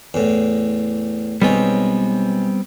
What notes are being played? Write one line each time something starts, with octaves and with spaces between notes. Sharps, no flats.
E2 A2
B1 G3 G#3 B3 C4 C#5